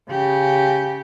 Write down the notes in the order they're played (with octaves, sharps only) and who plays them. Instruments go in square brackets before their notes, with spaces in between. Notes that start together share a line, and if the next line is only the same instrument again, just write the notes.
[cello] C#3 G4